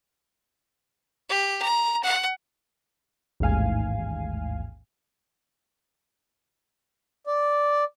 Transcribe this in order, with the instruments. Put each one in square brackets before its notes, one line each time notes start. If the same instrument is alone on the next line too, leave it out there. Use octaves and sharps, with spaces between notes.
[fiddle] G4
A#5
F#5
[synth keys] A1 D#2 G#2 F5 G#5
[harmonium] D5